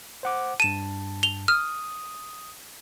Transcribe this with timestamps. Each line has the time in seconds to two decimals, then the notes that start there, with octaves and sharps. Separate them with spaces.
0.23 C5 F#5 D6
0.60 G2 A5 D#7 E7
1.23 F7 G7
1.48 D#6 F6